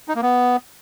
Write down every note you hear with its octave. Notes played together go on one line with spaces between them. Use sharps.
D#4
A#3
B3